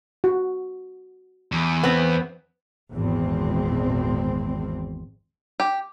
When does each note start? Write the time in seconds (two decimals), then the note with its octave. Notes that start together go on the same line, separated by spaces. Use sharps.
0.24 F#4
1.52 E2
1.83 B3 C4
2.94 G#1 E2 A#2 C4
5.60 G4